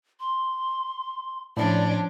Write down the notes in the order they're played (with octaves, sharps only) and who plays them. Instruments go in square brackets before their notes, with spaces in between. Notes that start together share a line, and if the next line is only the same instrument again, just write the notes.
[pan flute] C6
[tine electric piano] A2 [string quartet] F3 C#4 D4 [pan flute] D5